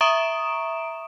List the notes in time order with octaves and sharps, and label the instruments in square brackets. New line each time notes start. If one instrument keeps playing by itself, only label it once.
[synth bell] E5 A#5 C#6 D#6 D7 E7